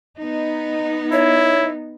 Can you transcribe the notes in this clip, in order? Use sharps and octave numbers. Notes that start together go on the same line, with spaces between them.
B3 D#4
E4 C#5